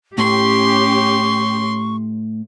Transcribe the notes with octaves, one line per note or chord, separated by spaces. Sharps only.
A2 C#4 G4 C6 C#6